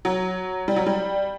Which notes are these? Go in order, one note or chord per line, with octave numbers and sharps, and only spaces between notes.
F#3
G3
F#3
G3